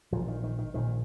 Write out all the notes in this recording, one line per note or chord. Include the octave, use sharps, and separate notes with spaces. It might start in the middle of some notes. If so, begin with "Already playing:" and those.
A#1 A#2 F3
D#3
D#3
D#3
A#1 A#2 D#3